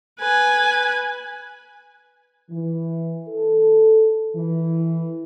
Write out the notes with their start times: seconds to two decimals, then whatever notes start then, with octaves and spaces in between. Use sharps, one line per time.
0.20 B4 G#5
2.51 E3
3.28 A4
4.36 E3